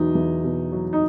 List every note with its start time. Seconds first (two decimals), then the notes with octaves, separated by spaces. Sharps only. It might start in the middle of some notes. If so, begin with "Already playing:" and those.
Already playing: E2 B2 F#3 D#4
0.15 E2
0.44 B2
0.72 F#3
0.93 D#4